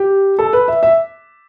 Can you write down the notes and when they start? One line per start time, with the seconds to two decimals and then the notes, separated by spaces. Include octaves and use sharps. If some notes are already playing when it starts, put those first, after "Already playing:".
Already playing: G4
0.39 A4
0.53 B4
0.68 E5
0.83 E5